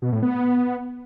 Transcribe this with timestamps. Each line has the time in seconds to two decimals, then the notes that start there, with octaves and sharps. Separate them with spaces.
0.02 B2
0.12 A2
0.23 B3